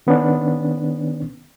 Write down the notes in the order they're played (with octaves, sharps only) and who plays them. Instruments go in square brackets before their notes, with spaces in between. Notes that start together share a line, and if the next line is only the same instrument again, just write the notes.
[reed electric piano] D#3 B3 C#4 D4